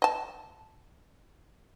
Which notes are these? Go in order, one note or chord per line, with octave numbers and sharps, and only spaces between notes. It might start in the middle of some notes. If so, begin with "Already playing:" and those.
D#5 A5